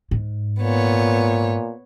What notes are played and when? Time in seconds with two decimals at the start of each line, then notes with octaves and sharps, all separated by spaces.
0.11 G#2
0.60 A#2 B3 C#5